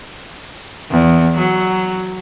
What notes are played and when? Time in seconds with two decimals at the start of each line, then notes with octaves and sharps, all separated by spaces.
0.91 E2
1.38 F#3